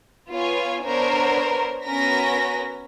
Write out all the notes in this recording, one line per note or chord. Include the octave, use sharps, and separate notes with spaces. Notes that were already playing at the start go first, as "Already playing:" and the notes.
B3 F4 C#5 F5 G#5
B3 D4 A#4 C5 C#5
B3 C#4 F#4 A#4 A#6 B6